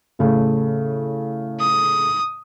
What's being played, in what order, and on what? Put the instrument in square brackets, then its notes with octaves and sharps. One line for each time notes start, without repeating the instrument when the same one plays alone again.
[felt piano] A2 C#3 A3
[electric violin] D#6